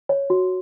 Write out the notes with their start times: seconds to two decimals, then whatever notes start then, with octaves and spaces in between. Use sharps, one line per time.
0.09 C#5
0.30 F#4